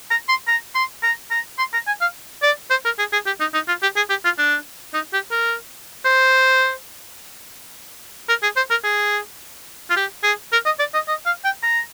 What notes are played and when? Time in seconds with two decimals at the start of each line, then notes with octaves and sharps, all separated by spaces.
0.11 A#5
0.29 C6
0.48 A#5
0.75 C6
1.03 A#5
1.31 A#5
1.58 C6
1.73 A#5
1.87 G#5
2.01 F5
2.42 D5
2.70 C5
2.85 A#4
2.99 G#4
3.12 G#4
3.26 G4
3.40 D#4
3.54 D#4
3.68 F4
3.82 G4
3.96 G#4
4.10 G4
4.25 F4
4.38 D4
4.94 D#4
5.13 G4
5.31 A#4
6.05 C5
8.29 A#4
8.43 G#4
8.56 C5
8.70 A#4
8.84 G#4
9.90 F4
9.96 G4
10.23 G#4
10.52 A#4
10.65 D#5
10.79 D5
10.94 D#5
11.08 D#5
11.26 F5
11.44 G5
11.63 A#5